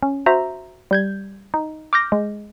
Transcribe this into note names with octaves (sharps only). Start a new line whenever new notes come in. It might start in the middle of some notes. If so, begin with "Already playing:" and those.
C#4
F#4 C5 E5 A#5
G3 G6 G#6
D#4
D6 F6 G6 A#6
G#3